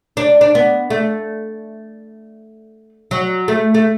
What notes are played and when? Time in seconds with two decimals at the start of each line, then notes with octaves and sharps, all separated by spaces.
0.17 D4
0.41 D4
0.55 B3
0.90 A3
3.11 F#3
3.48 A3
3.74 A3